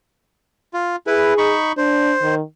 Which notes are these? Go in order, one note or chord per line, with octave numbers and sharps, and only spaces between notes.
F4
E4 G#4 B4
D#4 B5 C#6
D4 C5
D#3